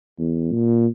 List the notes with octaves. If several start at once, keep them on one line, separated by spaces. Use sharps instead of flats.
E2
A#2